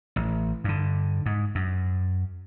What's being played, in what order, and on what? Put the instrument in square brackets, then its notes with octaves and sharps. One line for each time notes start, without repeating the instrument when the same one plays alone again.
[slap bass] A1
G2 D3
G#2
F#2